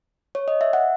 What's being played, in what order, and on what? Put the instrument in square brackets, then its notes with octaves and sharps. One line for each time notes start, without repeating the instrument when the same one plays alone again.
[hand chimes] C#5
D#5
E5
F#5